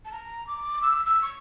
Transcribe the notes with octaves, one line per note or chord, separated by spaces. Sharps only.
A5
A#5
D6
E6
E6
C#6